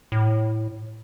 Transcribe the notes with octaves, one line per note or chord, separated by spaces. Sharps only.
A2